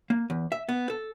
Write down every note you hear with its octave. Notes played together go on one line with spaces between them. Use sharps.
A#3
E2
E5
B3
A4